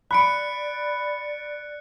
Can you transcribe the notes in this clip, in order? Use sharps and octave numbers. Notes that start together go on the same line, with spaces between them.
D5 B5 F#6 C#7 D7